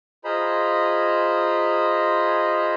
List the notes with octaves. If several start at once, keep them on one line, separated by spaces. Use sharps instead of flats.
F4 G#4 C5 D#5 A#5 B5